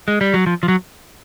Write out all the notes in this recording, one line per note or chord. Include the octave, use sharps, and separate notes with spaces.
G#3
G3
F#3
F3
F3
F#3